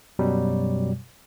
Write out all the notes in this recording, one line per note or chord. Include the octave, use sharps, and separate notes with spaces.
F#2 B2 F#3 G3